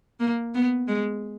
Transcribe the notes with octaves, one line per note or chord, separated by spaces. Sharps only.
A#3
B3
G#3